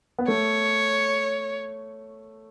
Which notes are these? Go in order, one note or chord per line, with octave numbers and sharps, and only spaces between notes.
B3
A3 C#5